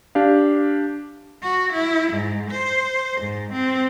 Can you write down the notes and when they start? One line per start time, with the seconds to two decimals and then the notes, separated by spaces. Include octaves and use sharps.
0.15 D4 G4 F5
1.42 F#4
1.73 E4
2.12 G#2
2.50 C5
3.21 G#2
3.52 C4